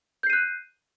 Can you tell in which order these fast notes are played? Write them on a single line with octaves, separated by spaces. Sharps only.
G6 C7 D#7 F#6